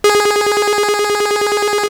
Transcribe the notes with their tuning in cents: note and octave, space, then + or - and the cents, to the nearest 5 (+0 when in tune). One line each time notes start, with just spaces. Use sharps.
G#4 -5